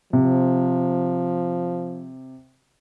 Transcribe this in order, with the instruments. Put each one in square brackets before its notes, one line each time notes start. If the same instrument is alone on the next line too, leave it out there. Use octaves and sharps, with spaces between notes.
[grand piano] C3 [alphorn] F3